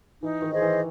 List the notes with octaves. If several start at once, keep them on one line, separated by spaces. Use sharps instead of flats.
E3 D#4
D#3
G#4 C5 D#5
E3